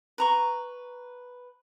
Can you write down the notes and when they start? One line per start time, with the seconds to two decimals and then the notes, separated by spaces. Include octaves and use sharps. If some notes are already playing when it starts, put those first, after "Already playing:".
0.18 B4 A#5 C#6